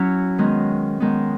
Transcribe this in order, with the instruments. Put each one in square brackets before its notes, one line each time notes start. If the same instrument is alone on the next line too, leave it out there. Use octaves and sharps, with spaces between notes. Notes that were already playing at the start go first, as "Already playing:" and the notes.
Already playing: [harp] F#3 C#4 E4
D#3 G#3 B3
D#3 G#3 B3